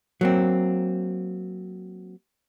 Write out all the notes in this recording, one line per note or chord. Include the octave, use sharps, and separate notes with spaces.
F#3 A#3 C4